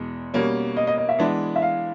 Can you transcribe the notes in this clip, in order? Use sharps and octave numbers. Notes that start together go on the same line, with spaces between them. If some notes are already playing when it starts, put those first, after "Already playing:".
Already playing: E2 B2 G#3
B2 G3 A#3 C#4
D#5
D#5
D#5
E5
E3 G#3 B3 D4
E5
F5